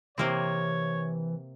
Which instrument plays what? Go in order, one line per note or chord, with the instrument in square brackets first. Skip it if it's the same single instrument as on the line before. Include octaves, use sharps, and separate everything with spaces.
[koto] C3 A#3 C4 [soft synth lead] E3 [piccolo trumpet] C#5